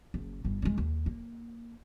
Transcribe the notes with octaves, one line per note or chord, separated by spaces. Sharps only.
F#1
G1
G#3 B3
D#2
A#3